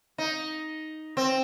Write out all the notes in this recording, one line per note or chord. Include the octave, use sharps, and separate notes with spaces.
D#4
C4